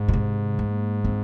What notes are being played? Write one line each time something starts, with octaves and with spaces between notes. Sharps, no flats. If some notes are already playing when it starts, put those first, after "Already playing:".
Already playing: G#2
A#2
C3
A#3
C4